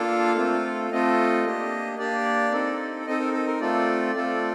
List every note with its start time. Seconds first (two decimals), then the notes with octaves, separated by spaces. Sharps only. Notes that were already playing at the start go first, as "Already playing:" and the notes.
Already playing: A#3 D4 F4 A4 F5
0.36 A3 C4 F4 A4
0.91 A3 C4 F4 A4 D#5
1.44 A#3 D4 G4
1.99 A#3 D4 G4 D5
2.52 C4 D#4 A4
3.06 C4 D#4 A4 D#5
3.20 A#4
3.33 A4
3.47 A#4
3.60 A3 C4 F4 A4 D5
4.15 A3 C4 F4 A4